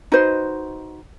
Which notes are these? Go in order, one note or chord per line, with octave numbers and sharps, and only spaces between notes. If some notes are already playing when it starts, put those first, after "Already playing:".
D#4 F#4 B4 C5